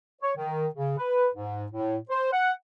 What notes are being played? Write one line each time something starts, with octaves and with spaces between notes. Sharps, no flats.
C#5
D#3
C#3
B4
G#2
A2
C5
F#5